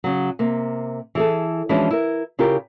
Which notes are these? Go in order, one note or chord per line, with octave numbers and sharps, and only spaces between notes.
C#3 F#3
C3 A#3
E3 G#4 A4
E3 F3 G#3 C#4 D4 F#4
E4 A#4
C#3 E4 F4 G4 A#4